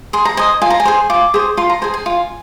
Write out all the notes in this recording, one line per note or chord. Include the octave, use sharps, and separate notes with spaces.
G#4 C6
A#5
C5 D#5 G#5
F4 G#5
A#5
G#5
G#4 C5
F4 D6
G#4 C5
F4 C6
A#5
G#4 C5 G#5
G#5
F4